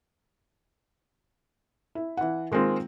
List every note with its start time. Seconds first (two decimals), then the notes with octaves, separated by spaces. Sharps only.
1.95 E4
2.17 E3 F#5
2.52 D#3 G#3 A#3 C4 F4